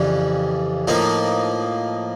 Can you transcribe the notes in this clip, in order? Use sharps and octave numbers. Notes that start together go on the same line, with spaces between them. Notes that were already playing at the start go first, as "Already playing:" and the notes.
Already playing: F2 C#3 E3 G3
A2 F3 A#3 D#4